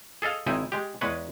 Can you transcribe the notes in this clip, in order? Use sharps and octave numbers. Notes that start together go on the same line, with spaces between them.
G#4 A4 D#5 F5
G#1 C4 D#4 E4 G#5
G#3 G4
E2 G#3 B4 C#5